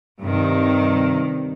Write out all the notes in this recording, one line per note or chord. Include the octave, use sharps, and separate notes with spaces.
G2 C3 D#3